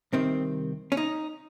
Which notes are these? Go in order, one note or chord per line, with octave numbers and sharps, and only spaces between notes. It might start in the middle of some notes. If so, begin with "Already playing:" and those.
C2 C3 D#3 C4
C#4
D#4